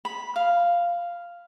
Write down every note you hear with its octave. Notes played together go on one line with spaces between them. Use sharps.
B5
F5